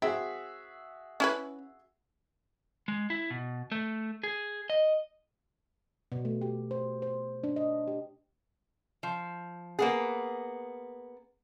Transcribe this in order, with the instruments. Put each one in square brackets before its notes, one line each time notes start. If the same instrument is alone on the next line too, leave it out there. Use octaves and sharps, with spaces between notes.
[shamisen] C4 [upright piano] F#4 G#4 E5
[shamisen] C#4 E4 B4
[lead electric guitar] G#3
E4
B2
A3
G#4
D#5
[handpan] B2
A3
G4
C5
C5
D4
D#5
G4
[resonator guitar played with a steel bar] F3
A#3 B3 G#4